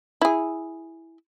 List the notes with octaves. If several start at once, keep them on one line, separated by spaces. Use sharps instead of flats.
E4 G#4